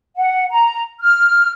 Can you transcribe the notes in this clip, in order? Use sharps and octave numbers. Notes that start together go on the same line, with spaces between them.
F#5
A#5
F6